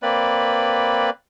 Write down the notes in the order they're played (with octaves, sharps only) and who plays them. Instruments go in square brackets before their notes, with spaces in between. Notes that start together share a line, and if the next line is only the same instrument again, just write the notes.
[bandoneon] A#3 C4 B4 D5 B5